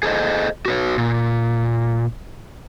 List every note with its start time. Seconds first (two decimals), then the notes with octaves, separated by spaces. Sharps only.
0.03 G#4 A4 C5 D#5
0.66 F#4 B4 C#5
0.98 A#2